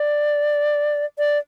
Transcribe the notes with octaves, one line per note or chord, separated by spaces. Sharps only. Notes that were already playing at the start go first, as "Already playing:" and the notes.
Already playing: D5
D5